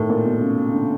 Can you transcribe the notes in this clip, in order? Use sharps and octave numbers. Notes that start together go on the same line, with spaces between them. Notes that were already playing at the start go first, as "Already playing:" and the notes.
Already playing: A2 D#3
A#2
B2
C#3
D3